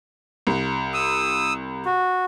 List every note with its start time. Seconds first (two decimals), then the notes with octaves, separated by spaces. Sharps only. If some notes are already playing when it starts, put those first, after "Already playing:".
0.47 C2
0.94 D#6 E6
1.86 F#4